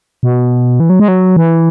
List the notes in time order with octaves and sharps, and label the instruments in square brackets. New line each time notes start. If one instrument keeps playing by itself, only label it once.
[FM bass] B2
E3
F#3
G#3
F#3
E3